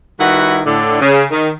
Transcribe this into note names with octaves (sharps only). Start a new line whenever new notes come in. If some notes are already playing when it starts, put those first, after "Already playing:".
D#3 G3 E4 F#4 B4 F#5
A2 D3 D5
C#3
D#3